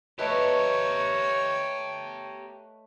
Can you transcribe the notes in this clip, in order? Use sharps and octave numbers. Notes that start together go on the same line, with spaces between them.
A3 G4 A#4 B4 C#5 D#5